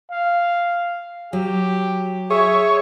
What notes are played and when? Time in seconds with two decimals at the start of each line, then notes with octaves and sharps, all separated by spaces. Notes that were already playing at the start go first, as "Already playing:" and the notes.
0.11 F5
1.33 F#3 G4
2.30 G#4 C#5 E5